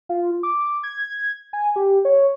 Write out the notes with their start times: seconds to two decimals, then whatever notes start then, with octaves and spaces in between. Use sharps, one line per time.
0.09 F4
0.43 D6
0.84 G#6
1.53 G#5
1.76 G4
2.05 C#5